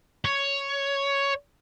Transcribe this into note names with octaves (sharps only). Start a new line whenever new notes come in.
C#5